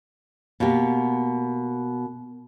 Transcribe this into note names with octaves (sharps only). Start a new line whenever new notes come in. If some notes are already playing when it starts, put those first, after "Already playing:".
B2 A#3 B3 G4